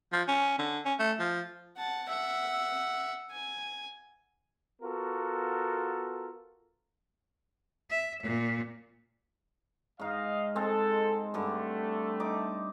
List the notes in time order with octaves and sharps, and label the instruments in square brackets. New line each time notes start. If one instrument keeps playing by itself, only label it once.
[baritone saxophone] F3
C#4
D3
C#4
A3
F3
[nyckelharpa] F#5 A5
E5 F#5
G#5
[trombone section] B3 F4 F#4 A4 A#4
[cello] E5
A#2
[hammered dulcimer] G#2 D#4 [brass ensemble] D#5 F5
[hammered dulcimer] G#3 C4 [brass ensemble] A4
[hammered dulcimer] G2 D3 G3 [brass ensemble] A3
[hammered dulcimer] D#4 D6